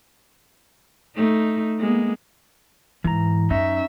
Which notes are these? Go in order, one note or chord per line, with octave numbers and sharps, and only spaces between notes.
A3 D#4
G#3 A#3 B3
G#2 E3 A#5
F#2 C#4 D#4 E5